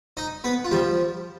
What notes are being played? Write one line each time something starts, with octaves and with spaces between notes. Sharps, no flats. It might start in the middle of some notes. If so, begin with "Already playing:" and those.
D#4 D#5
B3 B4
F4
F3 G3 G4